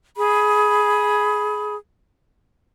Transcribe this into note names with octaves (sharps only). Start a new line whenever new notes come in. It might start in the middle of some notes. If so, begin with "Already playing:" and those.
G#4 B5